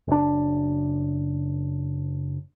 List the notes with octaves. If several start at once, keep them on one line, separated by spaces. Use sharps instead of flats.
F#1 D4